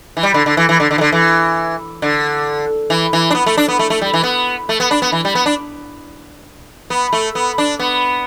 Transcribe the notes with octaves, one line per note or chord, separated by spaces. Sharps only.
E3
G3
D3
D3
E3
E3
D3
D3
E3
D3
E3
D3
E3
E3
D4
B3
A3
D4
B3
A3
A3
G3
E3
B3
A3
B3
D4
B3
E3
G3
B3
D4
B3
A3
B3
D4
B3